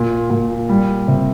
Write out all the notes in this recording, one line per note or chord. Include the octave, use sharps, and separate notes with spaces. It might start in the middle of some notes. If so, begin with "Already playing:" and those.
Already playing: A#2
A#2
G3
C3